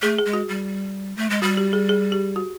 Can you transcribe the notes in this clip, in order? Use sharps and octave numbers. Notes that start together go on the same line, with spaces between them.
A3 G#4
G#4
G#3
F#4
G3
A3
G#3
G3 F#4
G4
G#4
G#4
G4
F#4